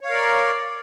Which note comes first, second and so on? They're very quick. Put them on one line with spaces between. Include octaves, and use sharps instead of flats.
C#5 F5 A#4 D5